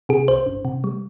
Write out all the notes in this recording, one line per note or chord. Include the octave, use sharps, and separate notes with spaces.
C3 G#4
C2 C5
G1
C3
G3